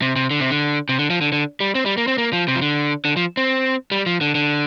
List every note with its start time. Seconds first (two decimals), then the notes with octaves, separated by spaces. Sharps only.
0.02 C3
0.16 C3
0.31 D3
0.40 C3
0.50 D3
0.89 C3
0.99 D3
1.10 F3
1.21 D3
1.32 D3
1.60 G3
1.75 C4
1.86 G3
1.97 A#3
2.08 C4
2.18 A#3
2.33 F3
2.48 C3
2.56 F3
2.62 D3
3.05 D3
3.17 F3
3.37 C4
3.92 G3
4.06 F3
4.21 D3
4.35 D3